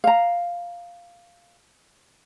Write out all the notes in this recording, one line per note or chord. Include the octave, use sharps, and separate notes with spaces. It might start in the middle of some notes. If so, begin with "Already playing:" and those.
F5 A#5